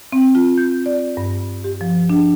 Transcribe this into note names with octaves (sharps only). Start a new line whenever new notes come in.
C4
F4
G6
D5
G2
G4
F3
D4